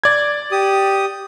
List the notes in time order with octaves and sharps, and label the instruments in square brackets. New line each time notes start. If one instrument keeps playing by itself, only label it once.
[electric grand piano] D5 G#6
[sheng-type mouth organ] G4 D#6